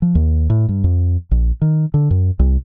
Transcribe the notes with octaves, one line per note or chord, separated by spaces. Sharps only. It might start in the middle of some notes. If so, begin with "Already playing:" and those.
F3
D#2
A2
G2
F2
A#1
D#3
D3
F#2
C2